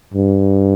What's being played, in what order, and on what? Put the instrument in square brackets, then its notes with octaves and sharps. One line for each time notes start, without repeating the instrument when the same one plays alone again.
[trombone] G2